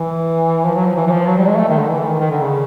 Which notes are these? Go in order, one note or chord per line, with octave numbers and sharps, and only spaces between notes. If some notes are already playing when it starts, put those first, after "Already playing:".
Already playing: E3
F3
F#3
F3
E3
E3
F3
F#3
G3
G#3
A3
D#3
D3
E3
D#3
D#3
D3
C#3